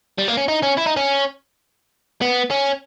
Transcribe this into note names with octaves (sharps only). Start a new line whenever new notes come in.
G3
A#3
C#4
D#4
C#4
E4
D#4
C#4
B3
C#4